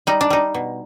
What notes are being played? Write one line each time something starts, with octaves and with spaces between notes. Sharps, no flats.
G3 D#4
D4
G3 D#4
B2